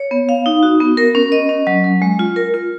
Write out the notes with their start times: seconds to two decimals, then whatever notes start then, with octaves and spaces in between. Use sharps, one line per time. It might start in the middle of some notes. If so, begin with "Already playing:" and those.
Already playing: C#5
0.11 B3
0.29 F5
0.46 D#4
0.63 F#4
0.80 B3
0.97 A#4
1.15 C#4
1.32 D#5
1.49 C#4
1.67 F#3
1.84 F#3
2.02 G#3
2.19 F4
2.36 A#4
2.54 F4